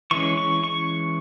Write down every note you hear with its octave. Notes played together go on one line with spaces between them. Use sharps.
E3 G#3 C#4 C#6
C#6
C#6